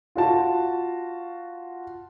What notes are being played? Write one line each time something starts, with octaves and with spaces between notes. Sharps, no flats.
F4 F#4 A5